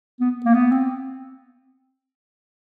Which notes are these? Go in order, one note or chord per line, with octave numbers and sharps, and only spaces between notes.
B3
A#3
B3
C4